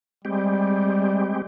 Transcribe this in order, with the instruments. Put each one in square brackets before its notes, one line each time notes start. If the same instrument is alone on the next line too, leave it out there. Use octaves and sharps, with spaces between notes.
[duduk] G3 [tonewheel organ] G#3 C4 G4